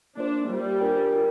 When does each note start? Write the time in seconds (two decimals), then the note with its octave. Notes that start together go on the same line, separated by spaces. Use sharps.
0.17 A#3 D4 F4 C5
0.49 G3 A#3 F4 C5
0.80 D4 F4 A#4 D5 G5
1.12 F4 A#4 D5 G5